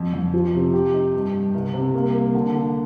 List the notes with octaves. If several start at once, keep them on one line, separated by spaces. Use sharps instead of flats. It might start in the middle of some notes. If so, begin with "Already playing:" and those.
Already playing: F2
F2
F3
C3
G4
D#4
G2
G2
C2
C3
A#3
A#3
D3
D3